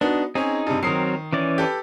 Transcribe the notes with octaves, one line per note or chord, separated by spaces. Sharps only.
B3 D4 D#4 F#4
C4 C#4 D#4 G#4
G2 C3
D#3 F#3 C4 A#4 D#6 C7
E3 C#4 D5
G4 A4 B4